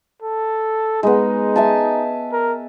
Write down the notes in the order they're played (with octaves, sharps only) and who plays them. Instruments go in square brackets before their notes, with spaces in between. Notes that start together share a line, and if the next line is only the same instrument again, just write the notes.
[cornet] A4
[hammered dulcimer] G#3 B3 [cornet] D#4
[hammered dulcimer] E5 G#5 A5
[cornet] A#4